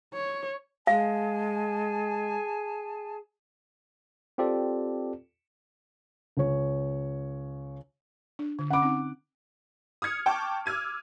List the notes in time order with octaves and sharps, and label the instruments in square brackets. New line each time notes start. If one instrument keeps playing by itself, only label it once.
[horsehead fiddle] C#5
[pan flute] G#3 [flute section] G#4 G#5 A5 [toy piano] F5
[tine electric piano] C4 F4 G4 A4 D5
[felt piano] C#2 C#5
[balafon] D4
D3
[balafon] C#4 B5 [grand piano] F#5 D6
[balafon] C4 D#4
[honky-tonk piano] D#6 F6 G#6 C#7
G5 A5 C#6 D6 F6
D6 E6 F6 G#6 D#7